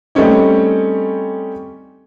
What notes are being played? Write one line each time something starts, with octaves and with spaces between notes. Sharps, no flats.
G3 A3 C4 C#4 D#4